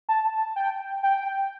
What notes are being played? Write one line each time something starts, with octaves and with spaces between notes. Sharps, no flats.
A5
G5
G5